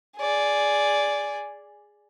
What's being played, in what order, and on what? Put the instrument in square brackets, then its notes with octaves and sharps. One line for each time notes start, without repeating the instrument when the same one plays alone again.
[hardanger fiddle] G#4 D5